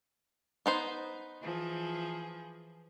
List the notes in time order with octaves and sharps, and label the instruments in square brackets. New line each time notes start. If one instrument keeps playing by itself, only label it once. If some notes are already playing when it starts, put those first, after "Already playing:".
[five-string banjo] B3 D#4 C5
[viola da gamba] E3 F3 G#4